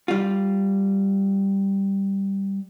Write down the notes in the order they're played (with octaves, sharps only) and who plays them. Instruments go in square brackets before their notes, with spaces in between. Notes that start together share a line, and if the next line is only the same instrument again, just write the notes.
[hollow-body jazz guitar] G3 F4